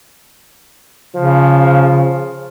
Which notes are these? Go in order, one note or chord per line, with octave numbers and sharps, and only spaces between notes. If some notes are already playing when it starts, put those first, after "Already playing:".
C#3 F3